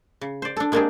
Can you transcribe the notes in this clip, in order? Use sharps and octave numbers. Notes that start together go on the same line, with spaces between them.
C#3
C5 D5
D4 A4
G#3 A#3 C4 D4 G4 G#4